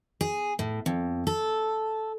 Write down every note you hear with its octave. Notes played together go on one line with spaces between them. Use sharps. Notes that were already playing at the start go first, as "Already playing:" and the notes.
G#4
A2
F2
A4